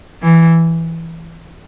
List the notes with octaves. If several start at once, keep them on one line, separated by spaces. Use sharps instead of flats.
E3